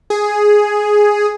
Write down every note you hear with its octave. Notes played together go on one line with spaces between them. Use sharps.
G#4